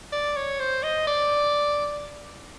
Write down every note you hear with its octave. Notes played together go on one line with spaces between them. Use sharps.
D5
C#5
C5
D#5
D5